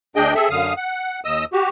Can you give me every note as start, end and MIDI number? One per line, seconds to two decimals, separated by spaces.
0.16 0.34 38
0.16 0.34 62
0.16 0.34 68
0.16 0.34 75
0.16 0.34 79
0.16 0.34 91
0.35 0.49 60
0.35 0.49 68
0.35 0.49 69
0.35 0.49 76
0.50 0.74 42
0.50 0.74 50
0.50 0.74 77
0.50 0.74 87
0.77 1.20 78
1.25 1.45 39
1.25 1.45 75
1.25 1.45 87
1.25 1.45 88
1.53 1.69 66
1.53 1.69 67